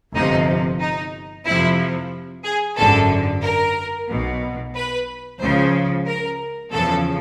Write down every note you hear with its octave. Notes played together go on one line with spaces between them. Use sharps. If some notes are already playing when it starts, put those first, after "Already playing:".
G1 F2 C3 F3 D#4
D#4
F2 C3 F3 E4
G#4
G#1 F#2 D3 A4
A#4
B1 B2
B4
C#2 C#3 F3 C5
A#4
E2 C#3 F3 A4